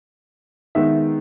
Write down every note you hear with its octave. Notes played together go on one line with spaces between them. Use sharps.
D#3 G#3 B3 D#4 E5